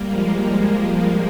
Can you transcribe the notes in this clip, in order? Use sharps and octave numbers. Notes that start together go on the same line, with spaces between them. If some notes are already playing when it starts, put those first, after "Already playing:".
Already playing: G3 A#3
F3 G#3